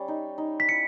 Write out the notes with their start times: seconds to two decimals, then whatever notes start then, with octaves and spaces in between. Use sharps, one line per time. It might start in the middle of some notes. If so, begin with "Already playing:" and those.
Already playing: G3 C#4
0.08 D#4
0.38 D#4
0.60 B6
0.69 E4 C#7